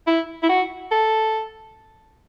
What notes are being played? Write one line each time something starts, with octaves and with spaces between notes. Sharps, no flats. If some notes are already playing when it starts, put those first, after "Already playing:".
E4
E4
F#4
A4